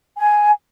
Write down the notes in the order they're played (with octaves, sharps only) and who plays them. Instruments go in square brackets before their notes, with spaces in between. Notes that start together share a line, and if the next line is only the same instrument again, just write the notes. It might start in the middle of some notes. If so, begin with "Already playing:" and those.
[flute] G#5